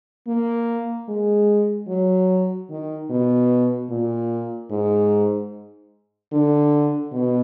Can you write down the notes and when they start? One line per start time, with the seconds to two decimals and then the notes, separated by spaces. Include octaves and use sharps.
0.27 A#3
1.09 G#3
1.88 F#3
2.70 D#3
3.10 B2
3.90 A#2
4.70 G#2
6.32 D3
7.13 B2